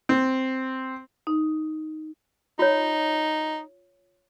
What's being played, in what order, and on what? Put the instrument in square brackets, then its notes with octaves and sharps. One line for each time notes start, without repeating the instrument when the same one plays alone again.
[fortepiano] C4
[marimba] D#4
[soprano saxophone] D#4 [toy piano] F4 C#5